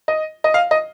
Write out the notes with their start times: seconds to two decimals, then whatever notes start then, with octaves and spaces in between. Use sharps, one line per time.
0.08 D#5
0.44 D#5
0.54 F5
0.71 D#5